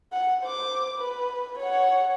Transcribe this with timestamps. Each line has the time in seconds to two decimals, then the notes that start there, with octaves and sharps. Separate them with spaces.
0.13 F#5
0.44 C5 D6
0.98 B4
1.59 C#5 F#5